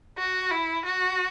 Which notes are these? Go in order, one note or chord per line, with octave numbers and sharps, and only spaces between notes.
F#4
E4
F#4